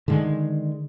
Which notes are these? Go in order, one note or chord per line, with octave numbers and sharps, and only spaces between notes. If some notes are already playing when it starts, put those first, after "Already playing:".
D3 D#3 G#3